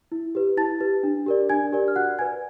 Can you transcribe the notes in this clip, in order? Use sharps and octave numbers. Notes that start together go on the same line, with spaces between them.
E4
G4 B4
E4 A5 A6
G4 B4
D4
G4 A#4 D5
D4 G#5 G#6
G4 A#4 D5
F6
F#4 F#5 F#6
B4 D5 G#5 G#6